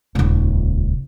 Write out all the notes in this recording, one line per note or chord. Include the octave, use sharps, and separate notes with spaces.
D#1 C#2